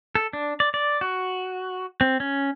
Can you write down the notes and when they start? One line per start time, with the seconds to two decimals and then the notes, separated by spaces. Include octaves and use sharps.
0.15 A4
0.33 D4
0.60 D5
0.74 D5
1.01 F#4
2.01 C4
2.20 C#4